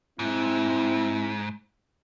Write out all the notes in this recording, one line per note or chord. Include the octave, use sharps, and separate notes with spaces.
G#2 C4 E4